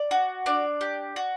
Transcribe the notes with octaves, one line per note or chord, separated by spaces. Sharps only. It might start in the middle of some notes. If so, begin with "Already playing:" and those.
Already playing: D5
F#4
D4 D5
G4
F#4